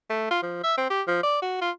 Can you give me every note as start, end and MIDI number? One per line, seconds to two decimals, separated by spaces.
0.10 0.29 57
0.31 0.40 65
0.43 0.63 53
0.63 0.75 76
0.77 0.85 60
0.90 1.02 67
1.07 1.21 53
1.23 1.40 74
1.42 1.61 66
1.61 1.71 65